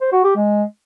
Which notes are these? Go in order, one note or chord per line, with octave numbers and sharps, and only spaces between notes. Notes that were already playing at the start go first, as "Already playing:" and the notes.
C5
F#4
G4
G#3